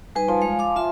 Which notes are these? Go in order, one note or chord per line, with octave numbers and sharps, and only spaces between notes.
G3 D#4 B4 G#5
F3
G#3 F5
F5 D6
F4 E5 C6